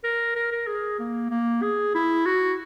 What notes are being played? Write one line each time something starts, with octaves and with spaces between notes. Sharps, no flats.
A#4
A#4
A#4
G#4
A#3
A#3
G#4
E4
F#4